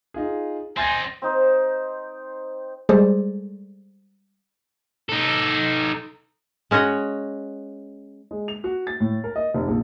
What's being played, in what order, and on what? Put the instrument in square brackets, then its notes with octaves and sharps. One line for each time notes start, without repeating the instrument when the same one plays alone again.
[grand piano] D#4 F4 G#4
[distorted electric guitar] C4 D#4 [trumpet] G#5 [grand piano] C6 G#6 A6
[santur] C4 D#4 C5
[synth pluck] G3 G#3 G#4 A4 C5 D5
[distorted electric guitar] D#4 A4
[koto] G#3 C#4 F#4 C#5 D#5
[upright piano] G#3
F7
F#4
A6
A2
A#4
D#5
F1
A#1